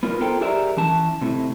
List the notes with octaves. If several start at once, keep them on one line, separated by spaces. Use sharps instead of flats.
B3 F4 A#4
F4 A4 A#4 C5 G5
G4 G#4 A#4 D5 E5
E3 C#4 A5
A2 C3